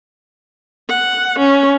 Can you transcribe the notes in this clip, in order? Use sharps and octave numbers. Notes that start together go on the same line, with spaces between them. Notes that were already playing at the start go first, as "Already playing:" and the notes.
F#5
C#4